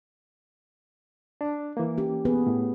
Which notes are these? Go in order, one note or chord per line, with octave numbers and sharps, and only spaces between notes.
D4
E3 A#3
C#4 G4
B3 G#4 B4
A2